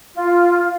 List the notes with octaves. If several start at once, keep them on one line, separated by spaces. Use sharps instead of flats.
F4